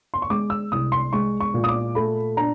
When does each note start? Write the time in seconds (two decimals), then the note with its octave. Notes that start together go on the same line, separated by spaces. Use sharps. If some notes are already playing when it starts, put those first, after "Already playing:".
0.14 C6
0.22 C#6
0.30 G#3 D6
0.50 E6
0.72 C2 D#6
0.92 C6
1.13 G#3 C#6
1.40 C#6
1.54 A#2
1.64 D#6
1.69 D6
1.95 A3 B5
2.37 D4 A#5